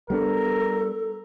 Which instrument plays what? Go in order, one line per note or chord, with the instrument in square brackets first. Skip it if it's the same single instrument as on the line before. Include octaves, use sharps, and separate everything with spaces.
[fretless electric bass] G3 B3 D4 [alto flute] A4 [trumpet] A#4